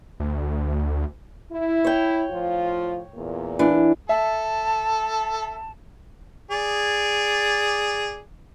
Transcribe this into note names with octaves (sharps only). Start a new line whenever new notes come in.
D2
E4
C#5 G5
A2 F3 F4
E2 A#2
E3 D4
A4 E5 A5
G#4 D5